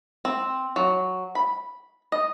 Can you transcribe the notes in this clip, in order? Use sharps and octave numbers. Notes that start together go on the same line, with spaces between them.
C4
F#3
B5
D#5